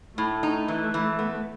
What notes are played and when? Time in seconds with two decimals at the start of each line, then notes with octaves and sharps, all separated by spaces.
0.18 A2 A3
0.43 D#4
0.68 E3
0.94 E3
1.19 B3